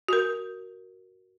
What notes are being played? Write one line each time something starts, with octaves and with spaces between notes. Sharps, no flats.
F#4 A#4